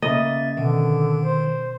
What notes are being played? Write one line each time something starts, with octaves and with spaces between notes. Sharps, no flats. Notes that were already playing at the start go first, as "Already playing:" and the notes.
C#3 A#3 D#5 E5 A6
B2 D3 D#3 D#7
C5